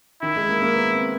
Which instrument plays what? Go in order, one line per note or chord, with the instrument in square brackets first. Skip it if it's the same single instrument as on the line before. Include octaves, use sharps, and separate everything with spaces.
[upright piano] D#3 [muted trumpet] E4
[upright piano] G#3
A#3
A#3
B3
C4